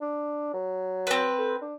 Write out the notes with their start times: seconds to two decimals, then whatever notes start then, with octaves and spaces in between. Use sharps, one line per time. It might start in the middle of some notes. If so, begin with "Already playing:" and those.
0.01 D4
0.54 F#3
1.07 C4 B4
1.39 A4
1.62 D4